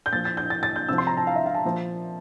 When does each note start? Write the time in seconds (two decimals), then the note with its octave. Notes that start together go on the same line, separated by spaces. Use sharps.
0.06 G6
0.13 A#2 F3 A6
0.25 A6
0.37 G6
0.50 A6
0.63 A6
0.76 G6
0.89 C3 F3 E6
0.98 C6
1.07 A#5
1.17 A5
1.27 F5
1.36 E5
1.46 F5
1.55 A5
1.65 A#2 F3